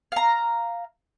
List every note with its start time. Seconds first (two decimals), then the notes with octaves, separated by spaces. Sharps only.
0.12 F5 A#5